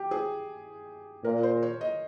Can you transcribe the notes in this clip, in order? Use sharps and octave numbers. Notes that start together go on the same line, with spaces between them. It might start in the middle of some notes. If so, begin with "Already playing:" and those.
Already playing: G4
G#4
A#2 A#4
C5
C#5
D#5